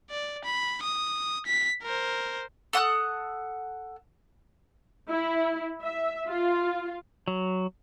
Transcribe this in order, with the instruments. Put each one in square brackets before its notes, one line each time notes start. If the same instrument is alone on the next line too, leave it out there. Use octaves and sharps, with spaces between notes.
[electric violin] D5
B5
D#6
B6
A#4 C5
[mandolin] A4 F#5 D#6 F#6
[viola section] E4
E5
F4
[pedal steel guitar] F#3